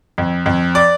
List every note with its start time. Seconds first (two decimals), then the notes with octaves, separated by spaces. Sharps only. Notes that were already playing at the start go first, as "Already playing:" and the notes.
0.18 F2
0.46 F2
0.75 D5